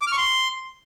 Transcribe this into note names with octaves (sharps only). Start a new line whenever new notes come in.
D6
F6
C#6
C6